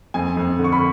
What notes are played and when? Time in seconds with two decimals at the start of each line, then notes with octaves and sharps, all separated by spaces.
0.14 F2 G#5
0.37 F2
0.59 D3
0.64 C#6
0.73 B5